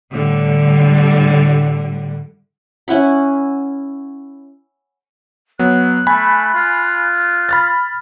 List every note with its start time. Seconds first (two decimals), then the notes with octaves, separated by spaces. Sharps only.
0.12 A2 D3 G3
2.88 C#4 E4 F#5 B5
5.59 F#3 B3 F#6
6.07 A3 G#5 B5
6.54 F4
7.49 B5 F6 A6